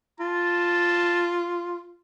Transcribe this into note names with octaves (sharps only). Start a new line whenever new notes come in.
F4 A5